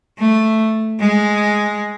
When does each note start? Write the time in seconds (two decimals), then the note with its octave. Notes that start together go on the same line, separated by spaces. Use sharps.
0.20 A3
1.00 G#3